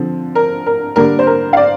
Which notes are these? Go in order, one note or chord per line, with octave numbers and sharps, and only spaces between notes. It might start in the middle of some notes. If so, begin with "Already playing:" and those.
Already playing: D3 F3 C4
A#4
A#4
D3 G3 A#3 D4 A#4
C5
A#4
F5
D5